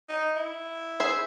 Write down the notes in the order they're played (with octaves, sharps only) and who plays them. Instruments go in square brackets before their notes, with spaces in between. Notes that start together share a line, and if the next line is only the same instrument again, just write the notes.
[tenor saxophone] D#4
E4
[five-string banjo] G#4 C5 E5